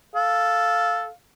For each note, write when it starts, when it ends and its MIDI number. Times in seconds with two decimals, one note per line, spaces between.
0.16 1.07 69
0.16 1.14 77